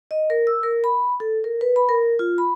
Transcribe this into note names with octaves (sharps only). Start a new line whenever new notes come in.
D#5
A#4
E6
A#4
B5
A4
A#4
B4
B5
A#4
F4
B5